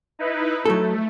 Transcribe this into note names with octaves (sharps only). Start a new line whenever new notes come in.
D#4 E4 B4
F#3 A3 A4